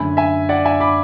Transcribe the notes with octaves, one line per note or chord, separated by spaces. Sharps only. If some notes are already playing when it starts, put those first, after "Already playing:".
Already playing: F#2 D3 A3 G#5 B5
E5 G#5
D5 F#5
E5 G#5
B5 D6